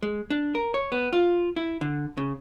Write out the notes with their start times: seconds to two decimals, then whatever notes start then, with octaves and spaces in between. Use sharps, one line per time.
0.02 G#3
0.30 D4
0.55 A#4
0.74 C#5
0.92 B3
1.13 F4
1.56 E4
1.81 D3
2.17 C#3